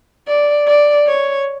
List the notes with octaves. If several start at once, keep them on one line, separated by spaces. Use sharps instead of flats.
D5
D5
C#5